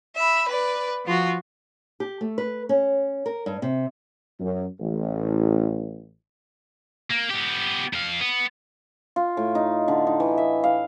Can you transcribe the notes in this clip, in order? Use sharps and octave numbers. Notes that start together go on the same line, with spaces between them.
E5 B5
B4 D5
F3 F4 F#4
G4
A3
B4
C#4
A#4
G2
C3
F#2
A1
A#3
B3 G4
F2 F5
B3
F4
A2
D#4
D3
D#4
E3
E5
F5